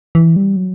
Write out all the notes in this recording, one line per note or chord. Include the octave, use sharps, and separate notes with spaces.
E3
G3
F#3